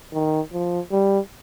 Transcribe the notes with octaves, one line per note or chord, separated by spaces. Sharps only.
D#3
F3
G3